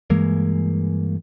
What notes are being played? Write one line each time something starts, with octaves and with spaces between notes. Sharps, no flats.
G2 E3 G#3 A#3